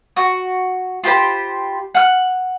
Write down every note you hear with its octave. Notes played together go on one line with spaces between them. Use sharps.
F#4
F4 G4 C5 B5
F#5 F6